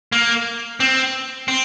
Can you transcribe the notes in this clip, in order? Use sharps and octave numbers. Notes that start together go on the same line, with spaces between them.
A#3
C4
C4